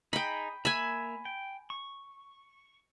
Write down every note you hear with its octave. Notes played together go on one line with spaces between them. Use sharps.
D#4 G#4 G5 B5
A#3 E5 G#5 B5
G5
C#6